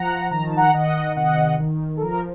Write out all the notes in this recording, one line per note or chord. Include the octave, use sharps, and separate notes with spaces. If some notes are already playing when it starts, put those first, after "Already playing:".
Already playing: F3 F#5 A#5
D#3 A#5
A5
F#5 A#5
D#3 D#5 F#5
C3 D#5 F#5
D#3
A4
F3 A#4